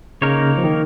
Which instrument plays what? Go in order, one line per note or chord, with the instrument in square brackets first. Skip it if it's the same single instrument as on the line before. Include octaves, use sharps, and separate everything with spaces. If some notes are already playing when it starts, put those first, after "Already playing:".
[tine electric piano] C#3 [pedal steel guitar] A#3 D#4 A#4 C#5
[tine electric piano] F3
D#3